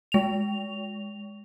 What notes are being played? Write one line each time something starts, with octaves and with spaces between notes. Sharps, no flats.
G#3 F7